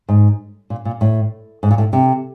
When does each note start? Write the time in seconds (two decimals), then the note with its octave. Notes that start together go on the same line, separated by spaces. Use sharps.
0.09 G#2
0.70 A#2
0.85 A#2
1.01 A2
1.63 G#2
1.71 A#2
1.78 A2
1.93 C3